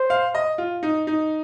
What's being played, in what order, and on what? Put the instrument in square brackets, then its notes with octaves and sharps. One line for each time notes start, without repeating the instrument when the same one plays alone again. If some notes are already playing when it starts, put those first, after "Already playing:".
Already playing: [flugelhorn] C5
[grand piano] F5
D#5
F4
D#4
D#4